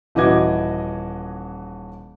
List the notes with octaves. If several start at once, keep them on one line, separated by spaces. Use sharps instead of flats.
D#1 E3 F#4 D#5 D6 G#6